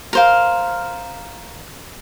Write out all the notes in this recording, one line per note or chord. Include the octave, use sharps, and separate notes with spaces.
A#4 C5 F5